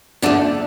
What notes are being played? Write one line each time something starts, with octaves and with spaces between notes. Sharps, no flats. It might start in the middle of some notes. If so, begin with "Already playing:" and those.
E2 D3 A3 D4